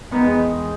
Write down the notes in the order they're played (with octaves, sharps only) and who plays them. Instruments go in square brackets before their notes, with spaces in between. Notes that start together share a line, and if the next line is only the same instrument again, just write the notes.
[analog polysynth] E2 D#3 G#3 D#4 [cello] B3